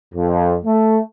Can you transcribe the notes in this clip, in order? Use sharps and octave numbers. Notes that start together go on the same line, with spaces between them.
F2
A3